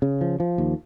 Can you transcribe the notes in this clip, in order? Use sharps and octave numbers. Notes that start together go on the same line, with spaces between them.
C#3
F3
F3
D#2